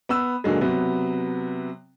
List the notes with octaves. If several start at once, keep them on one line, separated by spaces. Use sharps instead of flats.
B3 B5 E6
A#2 D3 F#3 G#3
C3 F#3 B3